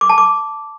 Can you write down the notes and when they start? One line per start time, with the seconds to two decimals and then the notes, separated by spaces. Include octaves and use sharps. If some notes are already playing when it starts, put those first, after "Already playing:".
0.01 D6
0.09 A5
0.18 D6